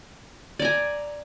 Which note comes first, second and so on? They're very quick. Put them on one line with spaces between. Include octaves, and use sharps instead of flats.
D5 A#5 G#5